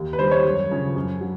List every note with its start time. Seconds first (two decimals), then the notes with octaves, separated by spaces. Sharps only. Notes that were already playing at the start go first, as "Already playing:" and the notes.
Already playing: D#2
0.13 B4
0.19 D#3 G3 C5
0.32 C#5
0.45 F#2
0.71 C#3 F3
0.96 F#2
1.21 F#3